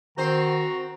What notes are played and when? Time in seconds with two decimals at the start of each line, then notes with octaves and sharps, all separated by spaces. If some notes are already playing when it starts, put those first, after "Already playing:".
0.18 D#3 C4 F#4 C5 A#5